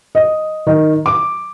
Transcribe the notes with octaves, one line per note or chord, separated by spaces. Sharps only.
D#5
D#3
D6